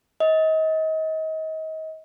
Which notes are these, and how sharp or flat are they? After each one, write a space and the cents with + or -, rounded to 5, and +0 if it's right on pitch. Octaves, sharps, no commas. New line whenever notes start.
D#5 +30